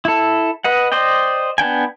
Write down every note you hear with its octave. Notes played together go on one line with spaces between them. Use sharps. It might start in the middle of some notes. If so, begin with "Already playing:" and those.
E4 A4
B4 D#5 F#5
C5 D5 D#5 G5
B3 D4 G5 G#5